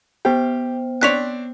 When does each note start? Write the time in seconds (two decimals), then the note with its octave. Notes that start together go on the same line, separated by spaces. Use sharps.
0.25 B3 G4 C5 G5
1.01 C4 D4 C#5 F#6 B6 F7